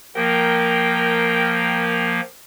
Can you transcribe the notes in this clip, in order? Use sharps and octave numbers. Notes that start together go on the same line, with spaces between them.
F3 A#3 A#4 G5